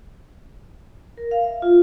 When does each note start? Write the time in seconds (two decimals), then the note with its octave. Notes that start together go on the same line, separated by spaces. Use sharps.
1.17 A#4
1.31 F5
1.44 E5
1.62 F4